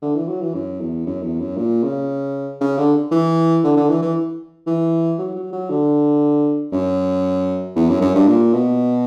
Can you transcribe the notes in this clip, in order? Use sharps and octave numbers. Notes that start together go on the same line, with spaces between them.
D3
E3
F#3
E3
F#2
E2
F#2
E2
F#2
A#2
C#3
C#3
D3
E3
D3
D3
E3
E3
E3
F#3
F#3
F#3
D3
F#2
E2
F#2
F#2
G2
A#2
B2